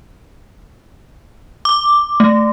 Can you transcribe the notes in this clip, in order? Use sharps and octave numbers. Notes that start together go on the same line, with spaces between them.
D6
A3